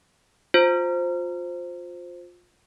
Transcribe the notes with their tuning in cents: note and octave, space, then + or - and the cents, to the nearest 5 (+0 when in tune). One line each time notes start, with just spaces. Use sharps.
F4 +25 C5 +0